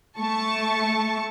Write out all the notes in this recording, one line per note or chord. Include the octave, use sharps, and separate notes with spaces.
A3 A5 C#6